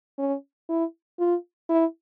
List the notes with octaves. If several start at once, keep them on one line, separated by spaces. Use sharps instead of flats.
C#4
E4
F4
E4